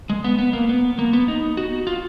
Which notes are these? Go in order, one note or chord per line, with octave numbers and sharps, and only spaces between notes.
G#3
B3
B3
A#3
B3
A#3
B3
D#4
F#4
F4